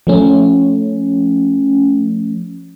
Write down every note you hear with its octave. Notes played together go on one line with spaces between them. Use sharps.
F3 A3 C#4